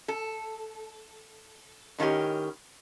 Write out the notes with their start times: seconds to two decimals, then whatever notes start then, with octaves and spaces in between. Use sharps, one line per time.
0.08 A4
1.98 A2 D#3 A3 C#4 G4